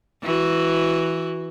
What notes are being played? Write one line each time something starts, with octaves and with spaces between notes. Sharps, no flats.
E3 F#4